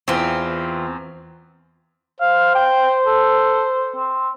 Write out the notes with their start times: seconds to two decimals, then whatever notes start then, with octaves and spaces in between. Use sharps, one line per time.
0.08 E2 E3 C4 F4
2.20 C5 F5
2.55 G5
3.06 A4
3.96 C4